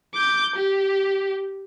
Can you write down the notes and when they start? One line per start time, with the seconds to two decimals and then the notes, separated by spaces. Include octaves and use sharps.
0.14 D6 G6
0.56 G4